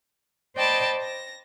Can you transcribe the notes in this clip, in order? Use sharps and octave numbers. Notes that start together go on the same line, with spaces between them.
C5 D5 D#5 G5 A5 B5
A#6